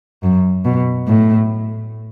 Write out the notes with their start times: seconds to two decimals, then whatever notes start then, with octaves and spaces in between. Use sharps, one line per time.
0.23 F#2
0.65 B2
1.08 A2